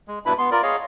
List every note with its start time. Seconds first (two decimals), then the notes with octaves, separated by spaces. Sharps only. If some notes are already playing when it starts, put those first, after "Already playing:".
0.08 G#3
0.26 G2 B2 D4 E4 B4 B5
0.38 B3 C6
0.51 F4 A#4 D5
0.63 G#4 C#5 D#5 F5